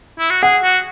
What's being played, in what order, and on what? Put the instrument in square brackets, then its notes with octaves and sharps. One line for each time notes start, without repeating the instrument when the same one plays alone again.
[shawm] E4
F#4
[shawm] G#4 [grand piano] F#5
[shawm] F#4